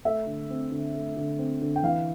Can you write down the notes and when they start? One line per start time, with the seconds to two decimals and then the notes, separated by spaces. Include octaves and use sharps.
0.05 A3 E5
0.27 D3
0.50 C4
0.72 D3
0.95 A3
1.17 D3
1.39 C4
1.62 D3
1.76 G5
1.83 E3 F5